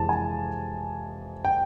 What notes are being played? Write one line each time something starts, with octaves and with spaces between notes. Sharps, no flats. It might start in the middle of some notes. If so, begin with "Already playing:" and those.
Already playing: F2 C3 E3 G#3 A5
G#5
G5